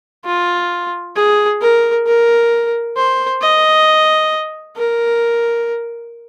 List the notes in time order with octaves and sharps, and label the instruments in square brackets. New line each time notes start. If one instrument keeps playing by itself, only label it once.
[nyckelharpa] F4
G#4
A#4
A#4
C5
D#5
A#4